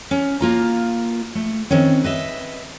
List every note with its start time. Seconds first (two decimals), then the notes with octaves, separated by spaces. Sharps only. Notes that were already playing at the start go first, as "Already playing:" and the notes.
0.11 C#4
0.41 A#3 F4 A#5
1.35 A3
1.70 D#3 C4 C#4
2.04 B4 D#5 E5